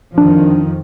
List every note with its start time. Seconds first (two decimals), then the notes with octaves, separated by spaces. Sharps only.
0.18 F2 D#3 F3 D4